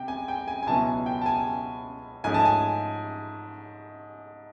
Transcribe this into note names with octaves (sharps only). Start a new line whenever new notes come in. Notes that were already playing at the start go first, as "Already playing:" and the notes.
Already playing: C3 G5
G#5
G5
G#5
G#5
C#2 B2 F#3 B3 E4 A5
G#5
G5
A5
G#5
G#2 F3 A3 C#4 G#5
A5
G#5